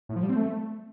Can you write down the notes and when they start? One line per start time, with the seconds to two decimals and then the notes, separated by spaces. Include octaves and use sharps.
0.09 A2
0.16 F3
0.23 G3
0.29 C4
0.36 A3